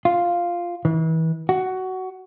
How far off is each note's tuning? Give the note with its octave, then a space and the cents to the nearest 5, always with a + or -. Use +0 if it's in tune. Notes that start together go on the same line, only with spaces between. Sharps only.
F4 +0
E3 -35
F#4 +15